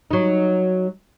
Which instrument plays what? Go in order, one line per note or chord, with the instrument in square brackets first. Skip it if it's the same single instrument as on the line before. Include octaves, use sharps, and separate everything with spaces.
[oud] F#3 D#4